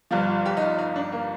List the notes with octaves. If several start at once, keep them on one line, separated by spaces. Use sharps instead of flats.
G1 G2 F3 F4
F4
G4
D#4
F4
D#4
D4
A#3